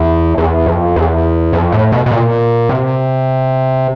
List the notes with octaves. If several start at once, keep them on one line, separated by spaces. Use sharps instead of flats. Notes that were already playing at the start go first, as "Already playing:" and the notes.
Already playing: E2
E2
F2
E2
F2
A2
B2
B2
A#2
C3